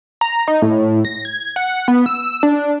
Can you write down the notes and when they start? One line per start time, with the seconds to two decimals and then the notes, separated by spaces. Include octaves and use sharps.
0.21 A#5
0.48 D#4
0.62 A2
1.05 A#6
1.25 G#6
1.56 F#5
1.88 B3
2.06 E6
2.43 D4